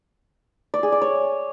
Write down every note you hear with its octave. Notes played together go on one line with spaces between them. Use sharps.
D5
G#4
D5
C#5